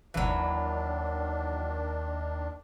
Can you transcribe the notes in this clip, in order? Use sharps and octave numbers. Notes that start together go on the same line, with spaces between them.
G1 D#2 D#3 E3 F#3 D4 F#6